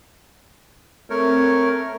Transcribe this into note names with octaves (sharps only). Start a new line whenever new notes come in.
A3 C4 A#4 C#5